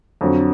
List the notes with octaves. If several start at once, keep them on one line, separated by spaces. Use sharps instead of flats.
F2 D3 F#3